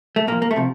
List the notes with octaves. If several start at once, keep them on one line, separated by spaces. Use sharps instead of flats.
A3
A#2 F3 A#3
A#3
A3
C3 F3